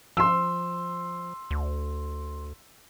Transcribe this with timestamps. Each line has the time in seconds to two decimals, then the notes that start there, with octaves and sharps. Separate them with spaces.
0.17 F3 C6 E6
1.51 D2